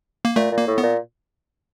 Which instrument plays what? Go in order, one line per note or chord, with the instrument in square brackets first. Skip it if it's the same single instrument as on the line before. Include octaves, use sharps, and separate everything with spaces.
[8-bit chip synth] A#3
[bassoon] A#2 [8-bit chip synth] A3
[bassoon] A#2
[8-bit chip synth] A#3
[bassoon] A2
[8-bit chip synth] B3
[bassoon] A#2